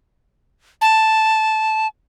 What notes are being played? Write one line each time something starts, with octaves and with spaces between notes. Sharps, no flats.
A5